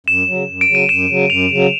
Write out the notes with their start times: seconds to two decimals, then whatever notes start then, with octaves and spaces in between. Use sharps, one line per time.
0.07 F#2 E7
0.27 F#3
0.32 C#3
0.48 F#2
0.61 D7
0.68 C#3 F#3
0.75 D#7
0.89 F#2 E7
1.09 C#3 F#3
1.29 F#2 F7
1.50 C#3 F#3